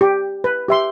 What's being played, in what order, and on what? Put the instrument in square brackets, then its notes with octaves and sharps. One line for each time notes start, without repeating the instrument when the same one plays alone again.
[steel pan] G4
B4
G4 E5 C6